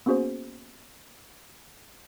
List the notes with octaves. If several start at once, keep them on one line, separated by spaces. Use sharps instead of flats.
A#3 B3 C#4 F#4 G#4 C5